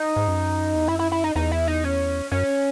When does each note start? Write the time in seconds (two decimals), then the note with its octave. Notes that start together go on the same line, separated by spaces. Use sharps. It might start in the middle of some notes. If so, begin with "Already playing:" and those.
Already playing: D#4
0.16 G#2
0.28 F#2
0.75 E2
0.88 F#2 E4
0.99 E4
1.12 E4
1.24 D#4
1.35 E2 D#4
1.52 E4
1.67 D#4
1.84 C#4
2.31 F#2 C#4